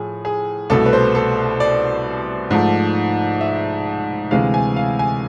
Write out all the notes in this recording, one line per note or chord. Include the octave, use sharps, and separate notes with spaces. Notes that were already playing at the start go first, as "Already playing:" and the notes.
Already playing: A2 F3 G#4
G#4
C2 B2 A3 A4
B4
C5
A4
D5
G#2 F3 A3
E5
D2 C3 E3 G#3 F5
G#5
F5
G#5